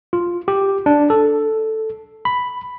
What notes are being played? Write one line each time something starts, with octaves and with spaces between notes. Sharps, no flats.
F4
G4
D4
A4
B5